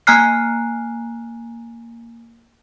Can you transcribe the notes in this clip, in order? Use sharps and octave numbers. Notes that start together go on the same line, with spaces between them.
A#3 G#5 A#5 F6 F#6 C7